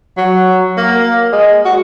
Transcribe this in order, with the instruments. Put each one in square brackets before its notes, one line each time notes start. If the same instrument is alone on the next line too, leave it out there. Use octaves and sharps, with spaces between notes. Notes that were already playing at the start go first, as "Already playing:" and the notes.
[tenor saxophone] F#3
A#3
G#3
F#4